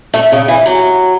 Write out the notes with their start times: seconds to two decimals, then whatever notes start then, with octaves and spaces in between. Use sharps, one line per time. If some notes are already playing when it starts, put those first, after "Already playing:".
0.14 A3
0.32 C#3
0.48 E3
0.66 F#3